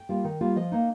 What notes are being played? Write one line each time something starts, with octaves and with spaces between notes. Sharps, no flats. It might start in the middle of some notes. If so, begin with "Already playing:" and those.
Already playing: G5
G3 A#3 F4
D#3
G3 A#3 F4
F3 D#5
A#3 D#4